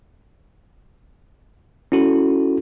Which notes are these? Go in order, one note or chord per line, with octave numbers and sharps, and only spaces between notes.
C#4 E4 F#4 A4